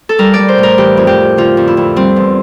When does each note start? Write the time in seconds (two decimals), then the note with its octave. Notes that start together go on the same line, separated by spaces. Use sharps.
0.09 A4
0.19 G3 A#4
0.34 G3 D5
0.48 C5
0.58 A2 A#4
0.78 E3 G4
0.97 F2
1.07 G4
1.18 F2
1.37 D3 F4
1.57 F2
1.67 E4
1.77 F2
1.96 G3 C4
2.16 E2